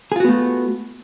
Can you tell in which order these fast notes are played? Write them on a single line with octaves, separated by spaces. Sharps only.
G#4 F4 F#4 B3 A3